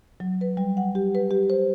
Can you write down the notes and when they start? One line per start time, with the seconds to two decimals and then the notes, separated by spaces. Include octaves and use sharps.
0.20 F#3
0.41 B4
0.57 G3
0.77 F#5
0.95 G4
1.15 B4
1.31 G4
1.50 C5